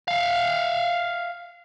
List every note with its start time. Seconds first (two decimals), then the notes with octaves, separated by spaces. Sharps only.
0.08 E5 F5